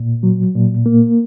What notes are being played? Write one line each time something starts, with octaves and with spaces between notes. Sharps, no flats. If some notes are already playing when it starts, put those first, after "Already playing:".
Already playing: A#2
F#3
A#2
A#3